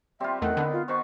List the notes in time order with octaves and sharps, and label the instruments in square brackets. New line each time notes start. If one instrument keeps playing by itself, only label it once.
[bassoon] G3 [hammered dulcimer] C4 F4 [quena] E5
[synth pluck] E2 A3 [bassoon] D#3 [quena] F#5
[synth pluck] D3 [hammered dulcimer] B3
[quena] F4
[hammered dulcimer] D#3 F#4 C#6 [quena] C5